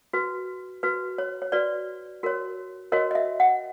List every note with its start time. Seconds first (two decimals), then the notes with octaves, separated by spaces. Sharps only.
0.13 F#4 B4
0.83 F#4 B4
1.18 C#5
1.42 C#5
1.52 F#4 B4 D5
2.23 F#4 A#4 C#5
2.92 F#4 A#4 C#5 D#5
3.11 D#5
3.15 E5
3.40 F#5